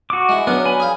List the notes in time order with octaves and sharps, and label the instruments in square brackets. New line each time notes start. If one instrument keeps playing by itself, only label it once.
[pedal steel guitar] F#4 D6
[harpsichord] G#3 E4
[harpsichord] F#3 D4 A#4 [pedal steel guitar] B3
[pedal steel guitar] G#5 B5
[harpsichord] G#4 F5 G5